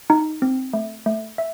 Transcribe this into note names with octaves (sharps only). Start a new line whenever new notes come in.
D#4
C4
A3
A3
E5